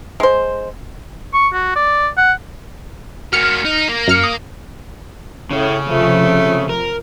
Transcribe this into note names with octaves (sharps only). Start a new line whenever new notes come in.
G#3 C5
C#6
F#4
D5
F#5
A#3 F#4 F6 C#7
D#4
A#3
F#2 F6 C#7
D#6
A2 C#3 C#4
C3 F3 A3
A#4